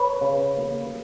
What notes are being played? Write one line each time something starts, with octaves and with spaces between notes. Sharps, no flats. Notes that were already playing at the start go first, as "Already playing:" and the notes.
Already playing: B4 C#5
C#3
A#3